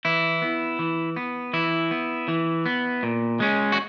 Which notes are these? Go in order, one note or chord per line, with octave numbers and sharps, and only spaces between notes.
E3 E4
B3
E3
B3
E3 E4
B3
E3
B3
A#2
G#3 C#4
F#4